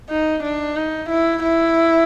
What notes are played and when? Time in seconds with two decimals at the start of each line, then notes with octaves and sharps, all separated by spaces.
0.10 D#4
0.44 D4
0.76 D#4
1.10 E4
1.43 E4